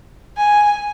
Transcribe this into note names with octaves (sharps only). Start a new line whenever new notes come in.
G#5